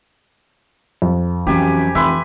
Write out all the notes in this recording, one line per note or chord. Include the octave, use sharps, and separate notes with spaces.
F2
F#2 E3 C4 G4 G#5
F1 E3 B4 E5 C6